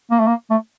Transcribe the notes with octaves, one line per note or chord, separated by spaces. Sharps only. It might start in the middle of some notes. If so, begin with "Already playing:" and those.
A#3
A3
A#3
A3